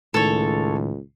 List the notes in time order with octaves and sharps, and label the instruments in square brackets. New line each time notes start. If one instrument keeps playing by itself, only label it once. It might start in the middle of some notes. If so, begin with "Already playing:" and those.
[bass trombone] C#2 [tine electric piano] A2 D#3 [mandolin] A4 C#5